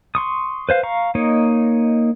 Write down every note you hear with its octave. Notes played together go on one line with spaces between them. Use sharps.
C6 C#6 D#6
B4 C5 F5
F5 A#5 C#6
A#3 D#4 C#5 D#5